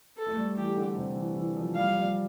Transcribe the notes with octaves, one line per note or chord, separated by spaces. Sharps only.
A4
A3
G3
E3 G4
D3
C3
E3
E3
F3
G3 F5
F3
G3